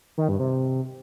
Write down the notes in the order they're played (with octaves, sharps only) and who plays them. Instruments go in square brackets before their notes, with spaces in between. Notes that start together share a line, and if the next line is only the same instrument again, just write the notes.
[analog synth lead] D#3
G2
C3